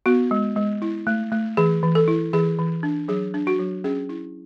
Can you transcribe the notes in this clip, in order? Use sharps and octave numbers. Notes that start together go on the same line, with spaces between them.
B3 F#4
G#3
G#3
E4
A3
A3
E3 G#4
E3
A4
E4
E3 G#4
E3
D4
F#3 G#4
D4
F#4
F#3
C#4 G#4
E4